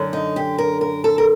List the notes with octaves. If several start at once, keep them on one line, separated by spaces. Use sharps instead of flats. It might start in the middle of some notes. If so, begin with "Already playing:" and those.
Already playing: F#2 D3
D#4
G4
A#4
A#4
A4
A#4